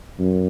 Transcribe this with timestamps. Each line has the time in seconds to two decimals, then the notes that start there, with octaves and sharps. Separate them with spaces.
0.19 F#2